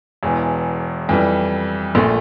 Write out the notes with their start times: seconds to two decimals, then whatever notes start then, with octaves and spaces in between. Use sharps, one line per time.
0.23 E1 E2 E3
1.09 F2 E3 G3
1.95 A#1 A#2 A3